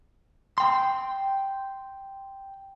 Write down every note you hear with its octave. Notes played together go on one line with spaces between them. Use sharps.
G5 C6